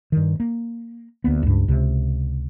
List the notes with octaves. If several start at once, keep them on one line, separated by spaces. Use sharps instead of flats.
G2 D#3
A#3
D2 A#3 B3
C#2 G2
C#2 C3